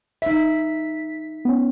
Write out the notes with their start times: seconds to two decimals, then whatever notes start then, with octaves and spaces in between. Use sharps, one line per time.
0.22 D#4 E5 B6
1.45 B3 C#4